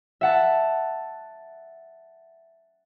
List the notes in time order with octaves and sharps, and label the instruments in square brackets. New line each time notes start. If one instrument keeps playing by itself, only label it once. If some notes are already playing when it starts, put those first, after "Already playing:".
[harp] E5 F#5 A5